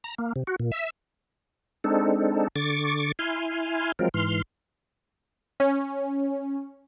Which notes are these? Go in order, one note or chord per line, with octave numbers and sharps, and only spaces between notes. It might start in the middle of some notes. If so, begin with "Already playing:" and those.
A#5
A#3
C3
F#4
A#2
E5
G#3 C4 D4 D#4 A4
D3 C#6 D6 A6
E4 G#5 C6 F6
F3 F#3 G#3 C4 F4 A#4
G#2 E3 C6 F6
C#4